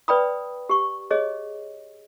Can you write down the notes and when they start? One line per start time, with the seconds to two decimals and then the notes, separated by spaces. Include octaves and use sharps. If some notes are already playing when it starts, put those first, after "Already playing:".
0.08 B4 D5 G5 B5 D#6
0.69 G4 C#6
1.11 G#4 C#5 D#5